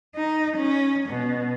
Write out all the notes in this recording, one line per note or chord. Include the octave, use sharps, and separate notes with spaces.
D#4
C#4
B2